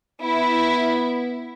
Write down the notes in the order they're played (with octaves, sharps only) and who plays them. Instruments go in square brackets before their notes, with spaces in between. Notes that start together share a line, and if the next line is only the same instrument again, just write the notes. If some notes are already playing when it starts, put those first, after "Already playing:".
[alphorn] B3 [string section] E4